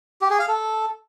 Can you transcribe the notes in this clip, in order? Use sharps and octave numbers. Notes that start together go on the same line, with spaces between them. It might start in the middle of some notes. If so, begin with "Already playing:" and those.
G4
G#4
F5
A4